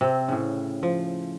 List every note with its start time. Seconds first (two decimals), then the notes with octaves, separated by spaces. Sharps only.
0.01 C3 C4
0.28 A2 C#3
0.83 F3